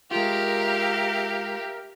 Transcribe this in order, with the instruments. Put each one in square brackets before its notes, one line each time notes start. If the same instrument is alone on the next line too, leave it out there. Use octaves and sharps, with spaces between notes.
[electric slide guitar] G#3 F4 [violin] G4 F5 [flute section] A#4 E5